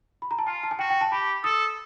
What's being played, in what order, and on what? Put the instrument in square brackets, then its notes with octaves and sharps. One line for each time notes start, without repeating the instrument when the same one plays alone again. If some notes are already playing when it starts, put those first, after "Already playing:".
[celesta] B5
A#5
A5
[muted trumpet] F4 [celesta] G#5
[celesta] A5
G#5
[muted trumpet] F#4 [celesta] G5
[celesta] G5
A5
[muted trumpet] G4 [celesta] B5
[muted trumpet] A4 [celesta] D#6